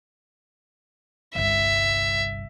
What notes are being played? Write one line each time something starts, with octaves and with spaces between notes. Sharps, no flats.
G1 C2 E5